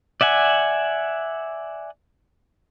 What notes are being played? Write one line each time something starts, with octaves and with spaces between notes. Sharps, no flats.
D5 E5 F#5 G#5